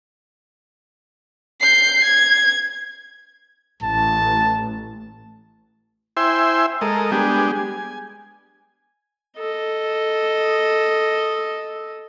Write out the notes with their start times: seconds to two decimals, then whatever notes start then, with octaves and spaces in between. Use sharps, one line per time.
1.61 G6 C7
2.04 G#6
3.83 A1 A5
6.17 E4 C5 E5 G5 G#5 C6
6.81 G#3 A4 A#4 D#5
7.12 G3 G#3 B3 D4 G4 G#4
7.55 G#5
9.38 A4 D#5